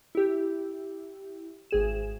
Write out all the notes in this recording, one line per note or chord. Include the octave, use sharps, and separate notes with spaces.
E4 G4
G#1 G#4 E7